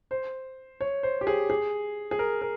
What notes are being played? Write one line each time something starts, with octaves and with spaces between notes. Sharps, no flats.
C5
C#5
C5
G4
G#4
G#4
G#4
A#4
A#4